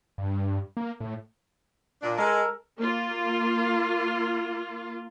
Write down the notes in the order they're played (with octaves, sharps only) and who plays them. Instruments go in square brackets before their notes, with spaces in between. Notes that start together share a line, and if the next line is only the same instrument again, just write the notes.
[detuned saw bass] G2
A#3
A2
[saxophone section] A#2 D4
[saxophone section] G#3 [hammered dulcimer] A4 A#4
[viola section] A#3 F4